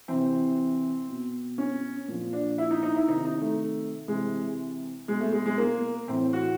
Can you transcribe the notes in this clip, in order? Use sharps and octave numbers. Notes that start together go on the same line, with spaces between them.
C3 E3 C4
B2
C#4
A#2 F3
D4
E4
D#4
D#4
E4
C3 D#3 D#4
D#4
A3
C3 E3 G#3
B2 G#3
A3
G#3
G#3
A#3
A2 E3 C4
F#4